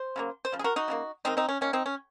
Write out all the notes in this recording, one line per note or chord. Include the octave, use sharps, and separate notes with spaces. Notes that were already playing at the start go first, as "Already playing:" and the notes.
Already playing: C5
C#3 F#3 A#3
C5
C#3 F3
G#4
F#4 A#4
D#4 F#4
C#3 F#3 A#3
D#3 G#3 C4 D#4
C4 D#4
C#4
D#3 A#3 C#4
C4 D#4
C#4